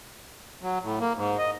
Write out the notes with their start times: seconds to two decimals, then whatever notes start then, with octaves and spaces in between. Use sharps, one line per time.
0.62 F#3
0.82 A2
1.00 A#3
1.16 G#2
1.38 D#5